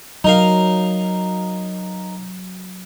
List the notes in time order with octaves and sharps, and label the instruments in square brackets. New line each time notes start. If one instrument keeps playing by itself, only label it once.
[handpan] F#3 [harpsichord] D#4 A#4 F5